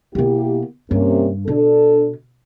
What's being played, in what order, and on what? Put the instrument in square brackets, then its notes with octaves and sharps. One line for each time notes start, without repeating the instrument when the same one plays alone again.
[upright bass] B2 B3 [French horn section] A#3 E4 G4
[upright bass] G2 [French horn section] C3 A#3 C#4
[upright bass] B2 [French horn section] D4 A4